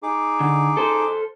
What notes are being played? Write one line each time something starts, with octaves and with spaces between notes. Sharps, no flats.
D#4 G#4 D6
D3
A4 C5